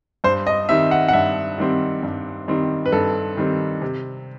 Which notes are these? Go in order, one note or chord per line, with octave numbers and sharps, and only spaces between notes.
G2 C5
D#5
D#3 G3 C4 E5
F#5
F#5
G2 E5
D#3 G3 C4
G2
D#3 G3 C4
B4
G2 A4
D#3 G3 C4
C3